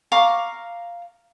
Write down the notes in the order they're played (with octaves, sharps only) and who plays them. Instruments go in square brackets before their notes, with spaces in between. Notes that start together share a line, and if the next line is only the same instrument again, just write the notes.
[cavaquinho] F5 A#5 C#6 D6